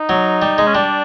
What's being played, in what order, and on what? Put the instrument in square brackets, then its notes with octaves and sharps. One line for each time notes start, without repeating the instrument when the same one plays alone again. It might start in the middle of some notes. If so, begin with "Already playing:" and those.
Already playing: [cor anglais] D#4
[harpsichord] F#3
G3
G#3
[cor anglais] C#4
[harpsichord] G3 [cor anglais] D4